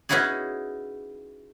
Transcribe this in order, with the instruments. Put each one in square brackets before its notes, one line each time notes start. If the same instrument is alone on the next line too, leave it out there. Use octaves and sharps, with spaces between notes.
[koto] B3 C#4 D#4 E4 F#4 G#4